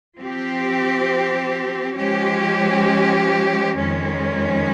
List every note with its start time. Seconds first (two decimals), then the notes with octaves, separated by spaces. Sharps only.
0.18 F3 C4 G4
1.97 F3 G#3 C#4 G4
3.76 F2 D#3 G#3 C#4